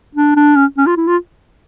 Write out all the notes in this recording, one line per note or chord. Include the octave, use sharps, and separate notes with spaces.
D4
D4
C#4
C#4
F4
E4
F4